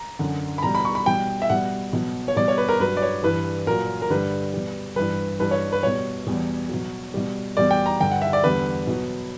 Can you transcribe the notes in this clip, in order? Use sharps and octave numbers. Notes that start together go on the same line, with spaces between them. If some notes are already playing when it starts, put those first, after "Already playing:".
Already playing: A#5
F#2 D3 F#3
B5
B2 G3 A#5
B5
C#6
B5
B2 G3 G5
E5
B2 G3 F#5
B2 F#3
C#5
B2 G3 D5
C#5
B4
A#4
G2 F#3 B4
D5
C#5
G2 E3 G3 B4
A#2 F#3 A#4
A#4
G2 D3 G3 B4
B2 G3
G2 E3 G3 B4
G2 E3 G3 B4
C#5
B4
B2 G3 C#5
E2 B2 G3
B2 F#3
B2 G3
E2 B2 G3 D5
G5
A#5
G2 D3 G3 G5
F#5
E5
D5
E2 D3 G3 B4
B2 F#3